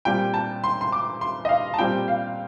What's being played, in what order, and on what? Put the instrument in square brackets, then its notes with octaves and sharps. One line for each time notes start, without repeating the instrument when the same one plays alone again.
[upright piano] A#2 G3 C4 G5
A5
C6
C6
D6
C6
D#5
F5
A5
A#2 G3 C4 G5
F5